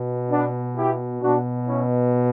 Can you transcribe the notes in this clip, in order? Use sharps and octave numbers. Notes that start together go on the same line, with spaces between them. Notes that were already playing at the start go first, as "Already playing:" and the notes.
Already playing: B2
B3 D4
E4 G4
B2 D4 F#4
C#4 E4